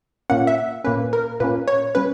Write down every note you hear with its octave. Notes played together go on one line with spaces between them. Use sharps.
A#2 A#3 C#4 F#5
E5
A#2 A#3 C#4 B4
A#4
A#2 A#3 C#4 B4
C#5
G3 C#4 B4